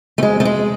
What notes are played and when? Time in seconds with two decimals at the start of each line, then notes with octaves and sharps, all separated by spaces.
0.18 A3
0.22 F2 G#3
0.40 A3
0.45 G#3